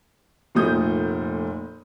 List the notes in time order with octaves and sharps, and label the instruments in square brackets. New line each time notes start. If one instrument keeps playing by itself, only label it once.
[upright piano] F1 A#2 A3 D#6 G6